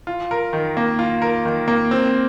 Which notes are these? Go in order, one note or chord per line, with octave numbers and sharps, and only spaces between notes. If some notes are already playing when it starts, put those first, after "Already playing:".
F4
A#4
D#3
A#3
F4
A#4
D#3
A#3
C4